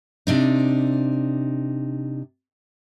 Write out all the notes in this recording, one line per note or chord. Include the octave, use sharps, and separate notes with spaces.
C3 D4 D#4